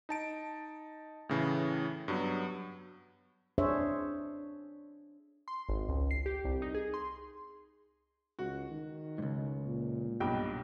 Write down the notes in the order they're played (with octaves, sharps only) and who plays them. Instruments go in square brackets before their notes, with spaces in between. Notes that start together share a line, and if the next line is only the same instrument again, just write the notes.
[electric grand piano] D#4 A5 D7
A2 C#3 E3
G2 F#3 B3
[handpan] D4 G#4 C5 C#5 E5
[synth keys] C6
G#1
C#2
C7
G4
C2
D#4
G#4
C6
[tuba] C#2 [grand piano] F#4
[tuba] D#3
[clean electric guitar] C#2 G#2
[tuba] A#2
[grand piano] B1 G2 G5